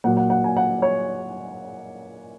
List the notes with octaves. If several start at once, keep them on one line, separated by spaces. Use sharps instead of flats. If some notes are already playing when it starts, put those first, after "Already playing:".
A#2 F#3 F#5
F#5
F#5
G#5
F#5
C#5